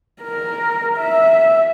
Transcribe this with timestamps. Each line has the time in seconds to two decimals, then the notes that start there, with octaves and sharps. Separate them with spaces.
0.22 A#4
0.98 E5